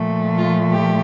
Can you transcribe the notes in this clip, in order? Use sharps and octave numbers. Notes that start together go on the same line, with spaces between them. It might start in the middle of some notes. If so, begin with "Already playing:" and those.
Already playing: A#2 F3 A3
F4
G4